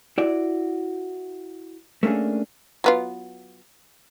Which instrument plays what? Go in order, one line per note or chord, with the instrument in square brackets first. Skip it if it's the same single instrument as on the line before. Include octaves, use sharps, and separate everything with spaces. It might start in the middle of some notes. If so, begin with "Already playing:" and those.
[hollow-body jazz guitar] E4 F#4 D5
A3 A#3 C#4 D4 G#4
[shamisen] F#3 B3 F4